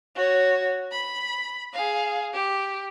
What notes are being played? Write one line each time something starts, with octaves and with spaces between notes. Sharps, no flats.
F#4 C#5
B5
G#4 F5
G4